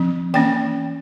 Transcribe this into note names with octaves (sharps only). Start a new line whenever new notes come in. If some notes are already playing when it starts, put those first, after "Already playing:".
Already playing: F3 C4
E3 A#3 C#4 G5